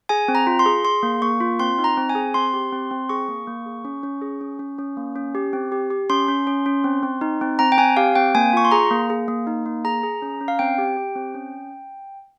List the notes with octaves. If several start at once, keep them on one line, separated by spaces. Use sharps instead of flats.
G#4 G#5
C4
A#5
F4
C6
G#4
G#4 C6
A#3
A#3 C#6
F4
C4 C6
D#4
A#5
C4
G#5
G#4
C4 C6
G4
C4
C4
G#4 C#6
A#3
A#3
G#4
C#4
C#4
G#4
C#4
C#4
C#4
A#3
C#4
G4
C4
G4
G4
C#4 C6
C#4
C#4
C#4
C4
C4
D#4
C4
C4 A#5
G5
C4 G#5
G4 F5
C4 G5
A#3 G#5
F4 C#6
C6
G#4 A#5
A#3
G#4
A#3
D#4
A#3
G#4 A#5
G#4
C#4
C#4
F5
C4 G5
G4
G4
C4
C#4